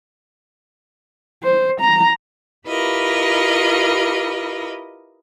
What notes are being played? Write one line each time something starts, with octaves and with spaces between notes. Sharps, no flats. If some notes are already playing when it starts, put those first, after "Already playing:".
C5
A#5
E4 F4 G4 A#4 B4 D#5